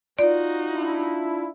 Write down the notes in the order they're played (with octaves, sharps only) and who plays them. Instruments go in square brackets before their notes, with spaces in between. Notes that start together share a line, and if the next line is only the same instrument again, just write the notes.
[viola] D#4 F#4 [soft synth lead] F4 [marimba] D5
[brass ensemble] D4 E4